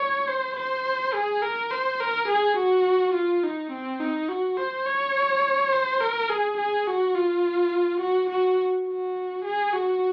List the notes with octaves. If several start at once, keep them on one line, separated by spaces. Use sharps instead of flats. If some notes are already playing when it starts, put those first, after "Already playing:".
Already playing: C#5
C5
C5
G#4
A#4
C5
A#4
G#4
F#4
F4
D#4
C4
D#4
F#4
C5
C#5
C5
A#4
G#4
G#4
F#4
F4
F#4
F#4
F#4
G#4
F#4